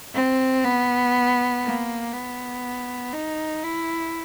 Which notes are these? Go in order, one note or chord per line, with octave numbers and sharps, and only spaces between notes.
C4
B3
A#3
B3
D#4
E4